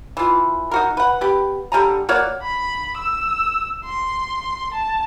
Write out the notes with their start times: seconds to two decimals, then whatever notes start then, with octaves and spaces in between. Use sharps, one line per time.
0.17 E3 F4
0.71 D#4 F#4 A#4
0.97 B4 F#5
1.21 B3 G4
1.72 D3 G3 G#5 A#5
2.09 A#3 F#4 C#5 D5
2.42 B5
2.97 E6
3.85 C6
4.74 A5